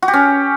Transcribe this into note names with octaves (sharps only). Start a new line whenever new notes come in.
F#4
G4
C#4